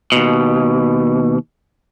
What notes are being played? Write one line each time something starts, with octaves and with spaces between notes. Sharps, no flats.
D#2 B2